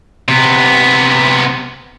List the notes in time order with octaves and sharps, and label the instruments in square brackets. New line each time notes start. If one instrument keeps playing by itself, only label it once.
[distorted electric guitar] C3 B3